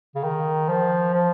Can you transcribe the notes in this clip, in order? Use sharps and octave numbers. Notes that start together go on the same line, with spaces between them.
C#3
D#3
F3
F3